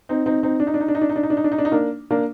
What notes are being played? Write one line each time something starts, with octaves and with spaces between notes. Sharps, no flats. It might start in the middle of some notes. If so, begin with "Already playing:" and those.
C4 D#4
C4 D#4
C4 D#4
D4
D#4
D4
D#4
D4
D#4
D4
D#4
D4
D#4
D4
D#4
D4
D#4
D4
D#4
A#3 D4
A#3 D4